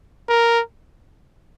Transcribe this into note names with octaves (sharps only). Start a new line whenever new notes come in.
A#4